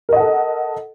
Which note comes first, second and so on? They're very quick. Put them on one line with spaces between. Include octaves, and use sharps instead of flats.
A#4 D#5 F#5 A4